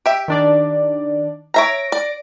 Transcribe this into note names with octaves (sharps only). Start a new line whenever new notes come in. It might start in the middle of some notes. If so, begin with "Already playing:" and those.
G4 E5 D7
D#3 D4 D5
C#5 E5 A#5 A#6 D7
D5